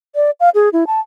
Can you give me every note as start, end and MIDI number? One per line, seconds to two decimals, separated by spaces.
0.15 0.30 74
0.40 0.49 77
0.55 0.69 68
0.73 0.84 64
0.87 1.00 81